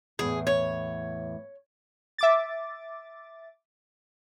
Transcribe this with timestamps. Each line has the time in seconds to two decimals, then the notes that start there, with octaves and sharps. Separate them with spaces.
0.19 E2 A2 G#4
0.47 C#5
2.18 E5 D6 A6